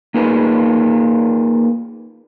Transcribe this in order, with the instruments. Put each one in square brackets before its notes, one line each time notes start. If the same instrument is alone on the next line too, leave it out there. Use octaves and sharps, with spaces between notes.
[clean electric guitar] A#3 D#4 F4 G#4 A#4 B4